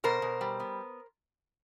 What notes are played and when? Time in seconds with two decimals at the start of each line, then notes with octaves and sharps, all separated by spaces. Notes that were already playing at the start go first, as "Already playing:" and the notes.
0.04 B2 A#4 C5
0.22 B2
0.41 G3
0.60 B3